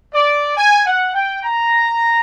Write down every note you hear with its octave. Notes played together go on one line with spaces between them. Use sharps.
D5
G#5
F#5
G5
A#5